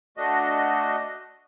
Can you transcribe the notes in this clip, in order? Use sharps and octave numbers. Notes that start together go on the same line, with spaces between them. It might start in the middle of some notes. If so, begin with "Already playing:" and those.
A3 D4 F#4 D#5